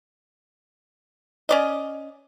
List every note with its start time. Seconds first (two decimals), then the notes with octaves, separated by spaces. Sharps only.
1.49 C#4 D5 D#5